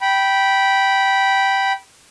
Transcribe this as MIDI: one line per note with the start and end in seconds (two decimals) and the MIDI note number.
0.01 1.72 79
0.01 1.72 83